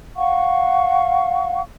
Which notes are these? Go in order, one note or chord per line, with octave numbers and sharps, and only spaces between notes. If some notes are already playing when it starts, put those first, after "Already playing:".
F5 F#5 C#6